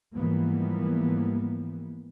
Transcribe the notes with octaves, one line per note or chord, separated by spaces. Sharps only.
G#2 E3 F3 G3 A#3 B3